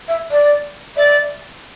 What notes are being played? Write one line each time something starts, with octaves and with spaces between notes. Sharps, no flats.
E5
D5
D5 E5